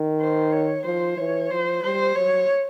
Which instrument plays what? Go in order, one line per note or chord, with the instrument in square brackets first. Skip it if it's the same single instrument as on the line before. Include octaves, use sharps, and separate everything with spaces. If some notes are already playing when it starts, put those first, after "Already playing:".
Already playing: [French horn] D#3
[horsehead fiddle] C5
C#5
[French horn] F3 [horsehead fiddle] C5
[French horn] E3 [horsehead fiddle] C#5
[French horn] F3 [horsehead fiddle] C5
[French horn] G3 [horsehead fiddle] C5
[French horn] F#3 [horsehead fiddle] C#5